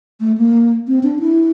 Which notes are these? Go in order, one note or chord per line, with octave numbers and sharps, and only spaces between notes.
A3
A#3
C4
D4
E4